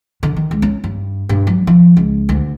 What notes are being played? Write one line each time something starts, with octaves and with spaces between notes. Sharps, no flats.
D3
D#3
C#2
C#4
G2
G2
F#3
F3
C#2
D2